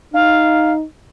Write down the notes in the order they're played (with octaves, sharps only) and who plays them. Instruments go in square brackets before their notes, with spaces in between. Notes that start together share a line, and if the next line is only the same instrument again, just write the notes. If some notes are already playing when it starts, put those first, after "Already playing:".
[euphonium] D#4 [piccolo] F5